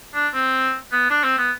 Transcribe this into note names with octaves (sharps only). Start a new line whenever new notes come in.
D4
C4
B3
D4
C4
B3